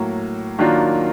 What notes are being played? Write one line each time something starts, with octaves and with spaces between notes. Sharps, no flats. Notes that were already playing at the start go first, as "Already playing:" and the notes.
Already playing: A2 F#3 A#3
D#3 F#3 A#3 D4 F4